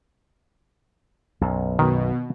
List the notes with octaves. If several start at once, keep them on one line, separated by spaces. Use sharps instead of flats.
B1 F#2
B2 D#3